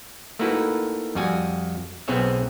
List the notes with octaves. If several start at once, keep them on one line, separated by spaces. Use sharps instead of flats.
A3 A#3 D#4 E4 F#4 B4
F2 G3 F#4 G#5
B1 B3 C4 G#4 C#5 E5